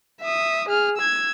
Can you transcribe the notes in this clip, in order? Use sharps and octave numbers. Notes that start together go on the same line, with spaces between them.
E5 D#6
G#4 F6
E6 G#6